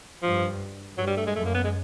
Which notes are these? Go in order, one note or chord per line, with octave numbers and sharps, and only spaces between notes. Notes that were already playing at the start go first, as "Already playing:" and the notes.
G2 F3
G2 F#3
G3
A3
G#3
F#2 A3
A#3
B3
G#3